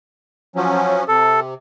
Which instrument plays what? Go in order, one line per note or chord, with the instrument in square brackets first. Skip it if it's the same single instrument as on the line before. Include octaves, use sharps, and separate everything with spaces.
[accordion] F3 F#3 C#4
[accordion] C3 [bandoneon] A4